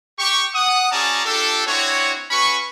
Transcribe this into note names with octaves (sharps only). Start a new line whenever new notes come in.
G4 C#6
F#5 D#6
C#4 F#4 G#4 D5 A5 A#5
D4 F4 G4 A4
C4 D4 E4 F#4 C#5
C#4 F#4 B4 B5 C#6